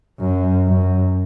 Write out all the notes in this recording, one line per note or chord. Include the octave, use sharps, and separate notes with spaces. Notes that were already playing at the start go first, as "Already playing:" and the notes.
F#2
F#2